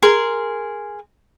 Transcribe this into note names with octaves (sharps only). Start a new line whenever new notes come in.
G#4 A#4 C6